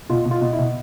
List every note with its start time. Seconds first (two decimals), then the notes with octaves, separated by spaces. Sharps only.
0.10 B2 F4
0.25 B2
0.31 F4
0.41 B2
0.53 E4
0.59 B2